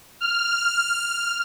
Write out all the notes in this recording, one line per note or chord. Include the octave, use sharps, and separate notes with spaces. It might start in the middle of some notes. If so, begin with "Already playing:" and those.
F6